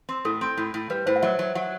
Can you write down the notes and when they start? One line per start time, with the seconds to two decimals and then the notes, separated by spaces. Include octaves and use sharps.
0.09 C4
0.25 A2 A4
0.41 C4
0.57 A2
0.74 A2
0.90 G3 B4
1.06 A2 C5
1.16 F#5
1.22 F#3 E5
1.39 F#3
1.55 F#3 F#5